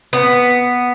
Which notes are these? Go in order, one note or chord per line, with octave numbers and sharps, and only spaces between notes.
B3